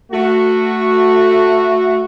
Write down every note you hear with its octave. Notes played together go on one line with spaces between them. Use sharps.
A3 F#4